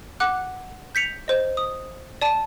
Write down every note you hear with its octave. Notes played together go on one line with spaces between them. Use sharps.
F#5 D6 F#6
G6 B6 C#7 F7
C5 D#5
D#6
D5 A5 D#7